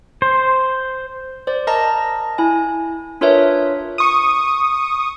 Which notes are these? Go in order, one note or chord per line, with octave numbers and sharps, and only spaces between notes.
C5
C5 D5
A#4 D#5 A5 A#5 A#6
E4 G#5
D4 F4 A#4 B4 C#5 E5
C#6 D#6